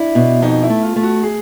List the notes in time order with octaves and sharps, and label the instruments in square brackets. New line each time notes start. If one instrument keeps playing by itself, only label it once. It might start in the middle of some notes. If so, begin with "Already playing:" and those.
Already playing: [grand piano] D4 [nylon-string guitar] E4
[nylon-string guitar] B2
[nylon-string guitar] F2 [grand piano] D#4
[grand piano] E4
[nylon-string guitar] A3
[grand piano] F4
[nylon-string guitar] A3
[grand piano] F#4
G#4